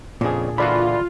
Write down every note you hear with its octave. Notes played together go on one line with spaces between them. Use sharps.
F2 A#2 C#3 D4 G#4
D3 E3 F4 F#4 D5 B5